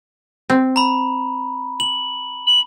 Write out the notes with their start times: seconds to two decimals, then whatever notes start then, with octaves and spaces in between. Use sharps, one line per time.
0.50 C4
0.76 A#5 B5
1.80 F#7
2.46 F#7